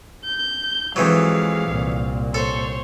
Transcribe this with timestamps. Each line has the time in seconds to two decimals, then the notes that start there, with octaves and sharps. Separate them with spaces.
0.24 G6
0.96 F2 E3 F#3 G#3 F5
1.68 C2 A#2
2.34 A4 C5 C#5